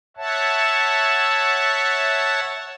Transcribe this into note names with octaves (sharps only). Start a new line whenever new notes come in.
C#5 E5 F#5 A5